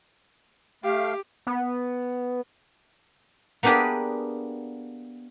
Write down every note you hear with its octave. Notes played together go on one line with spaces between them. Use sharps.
A3 G4 F5
B3
A#3 B3 D4 G4 G#4 B4